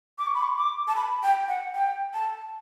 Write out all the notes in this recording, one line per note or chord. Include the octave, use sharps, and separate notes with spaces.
D6
C#6
B5
C#6
D6
A5
B5
G5
F#5
G5
A5